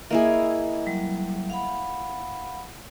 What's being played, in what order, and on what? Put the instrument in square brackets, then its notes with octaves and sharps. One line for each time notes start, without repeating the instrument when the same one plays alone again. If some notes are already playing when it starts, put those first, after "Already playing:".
[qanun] A#3 E4 G#4 [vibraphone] D#5 E5
[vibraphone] F#3 G3
F5 F#5 B5